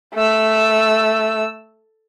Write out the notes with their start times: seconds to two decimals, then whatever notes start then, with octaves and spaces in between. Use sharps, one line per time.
0.14 A3 E6